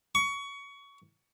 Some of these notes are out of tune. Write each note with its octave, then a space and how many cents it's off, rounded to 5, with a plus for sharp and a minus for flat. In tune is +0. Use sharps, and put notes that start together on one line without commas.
C#6 +20